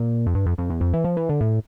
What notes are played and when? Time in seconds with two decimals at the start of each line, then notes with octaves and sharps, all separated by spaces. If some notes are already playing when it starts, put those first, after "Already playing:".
Already playing: A#2
0.26 F2
0.35 G2
0.46 F2
0.58 F2
0.70 E2
0.81 F2
0.94 E3
1.04 F3
1.17 E3
1.29 D3
1.41 A2